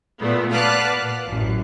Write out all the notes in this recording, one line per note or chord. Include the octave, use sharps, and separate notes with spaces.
A#2 A3 B3
B4 D5 F5 F#5 A5 F#6
A#2
A1 F#2